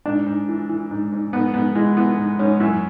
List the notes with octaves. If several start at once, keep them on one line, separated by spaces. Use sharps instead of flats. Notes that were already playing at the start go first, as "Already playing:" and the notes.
G#2 D4
G#2
E3
E3
G#2
G#2
G#2 B3
G#2 B3
E3 G#3
E3 B3
G#2
G#2 C#4
F#2 E4